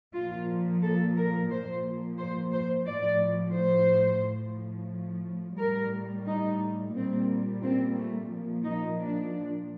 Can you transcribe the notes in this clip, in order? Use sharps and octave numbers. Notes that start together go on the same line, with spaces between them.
A#2 F3 F4
A4
A#4
A#2 F3 C5
C5
C5
A2 F3 D5
C5
A2 F3
A2 G3 A#4
D#4
A#2 G3 C4
C4
A3
A#2 F3
D#4
D4